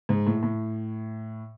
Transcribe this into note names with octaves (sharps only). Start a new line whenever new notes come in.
G#2
A2
A2